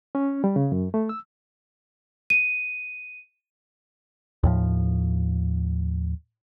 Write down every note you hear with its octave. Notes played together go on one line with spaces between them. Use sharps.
C#4
G3
C#3
F#2
A3
E6
D#7
D#2 A2 F3